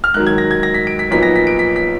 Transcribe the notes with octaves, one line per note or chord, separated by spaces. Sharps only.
F6
G#2 D#3 F#3 F#6
G#6
A#6
G#6
A#6
B6
D7
B6
B1 A#2 F3 B3 D#4 B6
A#6
B6
D7
B6
B6